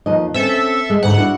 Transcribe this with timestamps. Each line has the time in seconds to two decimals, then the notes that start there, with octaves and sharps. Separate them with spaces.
0.06 D#2 F3 D#5
0.34 C4 C#4 A4 E5
0.90 G#3
1.03 D2 G#2 C#3 F#5
1.18 D4 E4 F#4